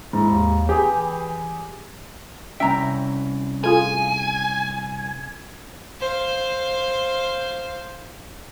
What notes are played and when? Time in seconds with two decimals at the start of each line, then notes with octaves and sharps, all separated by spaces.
0.13 G#2 E4
0.29 D#2
0.69 E3 G4 G#4
2.60 C2 C#4 E5 G5 A#5
3.64 A3 F4 G#4 G#5
6.00 C5 F5